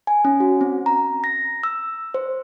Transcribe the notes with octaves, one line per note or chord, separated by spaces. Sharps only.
G#5
C#4
F#4
C4
A#5
A#6
E6
C5